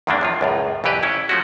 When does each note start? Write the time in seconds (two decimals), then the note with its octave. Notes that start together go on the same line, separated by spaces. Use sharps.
0.07 E2 G2 D#3 E3 A#3 D4
0.21 F#2 F3 F4
0.41 C#2 F#2 A2
0.84 C2 F2 E3 G4 B4
1.03 C#4 E4
1.29 F3 A3 C#4 E4 F#4